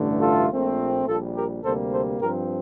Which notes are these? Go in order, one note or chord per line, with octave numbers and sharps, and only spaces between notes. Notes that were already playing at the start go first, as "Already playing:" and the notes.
Already playing: A1 G2 D3 A3
F4 A4
A#1 A#2 A3 C4
A#1 A#2 G3 F4 A4
G4 A#4
D2 C3 G3 A#3 A4 C5
A4 C5
G2 F3 C4 G4 A#4